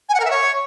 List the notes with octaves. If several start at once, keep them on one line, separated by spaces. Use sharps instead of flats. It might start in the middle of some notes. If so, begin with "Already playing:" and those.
G#5
F#5
A#4
E5
C#5